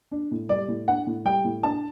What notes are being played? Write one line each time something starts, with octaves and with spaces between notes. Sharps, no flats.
D4
A2
G3 D5
A2
D4 F#5
A2
G3 G5
A2
D4 A5